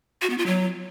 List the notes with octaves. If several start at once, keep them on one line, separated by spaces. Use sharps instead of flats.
F#4
B3
F4
F#3